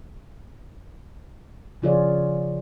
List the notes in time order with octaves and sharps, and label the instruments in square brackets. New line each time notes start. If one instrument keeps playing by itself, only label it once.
[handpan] C#3 F3 F4 G#4 C#5 D5